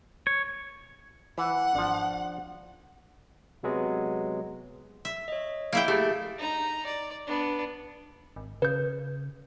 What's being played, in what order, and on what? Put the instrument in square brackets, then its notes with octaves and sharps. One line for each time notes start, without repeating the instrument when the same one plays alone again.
[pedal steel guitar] C#5
[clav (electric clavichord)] E3 [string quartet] F#5
[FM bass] G#1 [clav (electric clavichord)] F3 D4
[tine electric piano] C3 F#3 G#3 B3
[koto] E5
[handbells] C#5 D#5
[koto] A#3 E4 G5
[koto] A3 [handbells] G4 G#4 B5
[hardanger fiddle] D#4 A#5
D5
B3 D4
[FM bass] G#1
[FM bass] C#3 [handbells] B4 G6